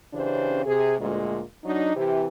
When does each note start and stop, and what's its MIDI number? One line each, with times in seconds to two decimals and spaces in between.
0.14 0.61 49
0.14 0.61 52
0.14 0.61 61
0.14 0.61 62
0.14 0.61 67
0.14 0.61 72
0.65 0.94 48
0.65 0.94 68
0.99 1.41 38
0.99 1.41 46
0.99 1.41 56
1.65 1.94 54
1.65 1.94 62
1.65 1.94 63
1.96 2.26 48
1.96 2.26 52
1.96 2.26 67